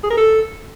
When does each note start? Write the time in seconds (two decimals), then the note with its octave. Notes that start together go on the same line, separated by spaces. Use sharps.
0.03 G#4
0.10 A#4
0.17 A4